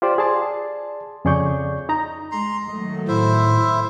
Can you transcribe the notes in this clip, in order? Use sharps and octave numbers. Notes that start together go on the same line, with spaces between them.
F4 G4 C5 D5
G#4 D5 A5 C6
F2 C#3 G#4 D5 C#6 G6
D#4 D#5 A#5
G#3 A#5 C6
D#3 F#3 A3 D#5
A2 E4 C5 E5